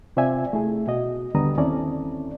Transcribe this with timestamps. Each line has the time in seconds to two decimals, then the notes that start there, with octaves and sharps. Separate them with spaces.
0.17 C3 C4 F4 D5 E5 G#5
0.53 A3 E4 G#4
0.87 B2 F#4 D#5
1.35 D#2 D3 G3 B3 A#5 D#6
1.57 D#2 C4 C#4 E4 A4 D5